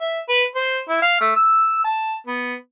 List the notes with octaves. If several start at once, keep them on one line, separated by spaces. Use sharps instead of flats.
E5
B4
C5
E4
F5
A3
E6
A5
B3